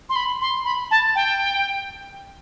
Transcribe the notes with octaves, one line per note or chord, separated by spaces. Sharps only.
C6
B5
C6
B5
A5
G5